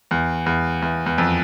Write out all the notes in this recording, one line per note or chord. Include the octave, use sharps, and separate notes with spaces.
E2
E2
E2
E2
F2